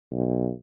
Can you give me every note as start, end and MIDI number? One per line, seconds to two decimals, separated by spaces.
0.12 0.50 35